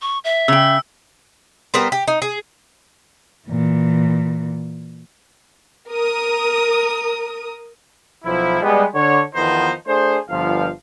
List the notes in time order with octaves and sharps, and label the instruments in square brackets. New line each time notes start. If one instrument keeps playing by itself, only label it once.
[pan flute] C#6
E5
[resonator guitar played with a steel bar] C#3 G5 [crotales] E6
[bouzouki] G3 B3 A#4 C5
G4
D#4
G#4
[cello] A#2 E3
[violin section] A#4 D#6
[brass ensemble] B1 F3 E4
G3 G#3 B3
D3 C#5
E2 D#3 F3 B3 D#4 C5
A3 D4 G#4 C5
G1 F3 F5